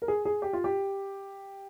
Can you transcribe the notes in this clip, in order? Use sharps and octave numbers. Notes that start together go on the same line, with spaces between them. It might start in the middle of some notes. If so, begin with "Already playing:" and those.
A#4
G#4
G#4
G4
F4
G4